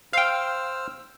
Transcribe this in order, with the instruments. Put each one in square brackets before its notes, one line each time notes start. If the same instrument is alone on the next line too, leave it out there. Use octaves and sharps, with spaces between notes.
[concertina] C5 E6 F6 [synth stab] F5 G5